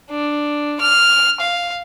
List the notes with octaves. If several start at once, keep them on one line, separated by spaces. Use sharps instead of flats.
D4
F6
F5